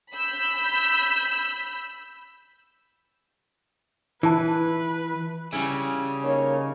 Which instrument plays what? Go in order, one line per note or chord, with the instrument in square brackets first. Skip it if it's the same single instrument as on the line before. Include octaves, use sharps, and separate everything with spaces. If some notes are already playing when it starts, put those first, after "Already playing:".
[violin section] B5 E6 G6
[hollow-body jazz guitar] E3 [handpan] E4 [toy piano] F4 A5 [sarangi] B4
[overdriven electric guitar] C#3 [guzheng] G3 C#4 E4
[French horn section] A#3 D#4 C#5